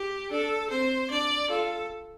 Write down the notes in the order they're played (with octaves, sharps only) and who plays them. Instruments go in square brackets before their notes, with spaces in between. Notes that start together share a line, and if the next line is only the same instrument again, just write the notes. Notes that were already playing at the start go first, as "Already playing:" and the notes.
Already playing: [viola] G4
[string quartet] D4 [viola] A4
[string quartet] C4 [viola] C5
[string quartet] D4 [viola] D5
[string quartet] F4 [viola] A4